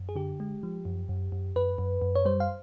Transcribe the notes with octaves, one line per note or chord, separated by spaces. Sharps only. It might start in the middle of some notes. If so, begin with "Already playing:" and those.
Already playing: F#2
G#4
D3 G4
G#3
F3
F#2
F#2
F#2
F#2 B4
F#2
F#2
C#5
G3 C5
F5